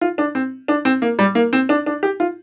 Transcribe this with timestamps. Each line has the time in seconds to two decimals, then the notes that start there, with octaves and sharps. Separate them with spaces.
0.01 F4
0.18 D4
0.35 C4
0.68 D4
0.85 C4
1.02 A#3
1.19 G3
1.35 A#3
1.53 C4
1.69 D4
1.86 D4
2.03 G4
2.20 F4